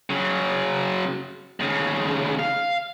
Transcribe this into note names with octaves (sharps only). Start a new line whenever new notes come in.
C#3 F#3
D#2 C#3
F5